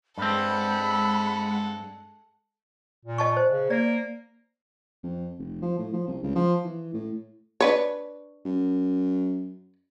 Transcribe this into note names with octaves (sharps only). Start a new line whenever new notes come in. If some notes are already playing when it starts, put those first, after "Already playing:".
G2 G#3 C4 A4 F#5 B5
A#2
D#5 A5 C#6
C5
C#3
A#3 D5
F2
F1
F3
A2
F3
C2
C#2
F3
E3
A2
D4 B4 C#5
F#2